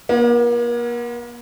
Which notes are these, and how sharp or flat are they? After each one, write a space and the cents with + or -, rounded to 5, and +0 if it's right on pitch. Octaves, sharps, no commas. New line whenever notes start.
A#3 +40 F4 -40 F#5 -20